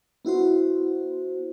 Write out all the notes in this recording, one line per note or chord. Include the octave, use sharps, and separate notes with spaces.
B3 E4 F#4 C5